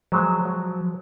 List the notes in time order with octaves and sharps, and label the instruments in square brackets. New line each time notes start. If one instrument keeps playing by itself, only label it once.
[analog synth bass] F3 [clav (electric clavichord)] F#3 G#3 C5
[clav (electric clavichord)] F#3